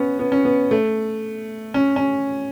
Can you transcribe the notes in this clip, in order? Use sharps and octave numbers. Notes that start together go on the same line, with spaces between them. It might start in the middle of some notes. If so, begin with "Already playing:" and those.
Already playing: B3 C#4
B3
C#4
B3
A3
C#4
C#4